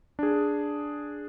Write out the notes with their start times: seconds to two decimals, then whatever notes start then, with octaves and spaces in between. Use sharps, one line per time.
0.19 D4 G#4